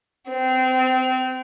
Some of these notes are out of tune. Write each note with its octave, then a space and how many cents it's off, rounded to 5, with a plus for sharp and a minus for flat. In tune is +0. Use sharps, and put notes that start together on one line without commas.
C4 -25